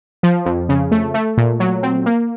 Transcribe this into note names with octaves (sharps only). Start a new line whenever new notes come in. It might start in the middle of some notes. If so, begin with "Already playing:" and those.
F3
F2
C#3
A3
A3
A#2
F#3
C4
A#3